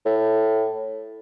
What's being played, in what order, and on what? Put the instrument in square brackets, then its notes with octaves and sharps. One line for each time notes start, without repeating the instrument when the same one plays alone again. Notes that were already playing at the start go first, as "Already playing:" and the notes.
[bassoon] A2